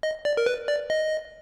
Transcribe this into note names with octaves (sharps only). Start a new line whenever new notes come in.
D#5
D5
A#4
B4
D5
D#5